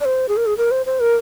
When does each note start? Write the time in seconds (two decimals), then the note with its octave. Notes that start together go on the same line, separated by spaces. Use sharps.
0.01 D5
0.05 C5
0.29 G#4
0.37 A#4
0.46 G#4
0.58 A#4
0.71 C5
0.86 C5
1.00 A#4